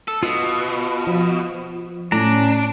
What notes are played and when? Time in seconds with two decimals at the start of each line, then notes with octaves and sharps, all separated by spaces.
0.08 A4
0.23 B2 F4 D#6
1.07 F3
2.12 A2 C#4 D4 A#5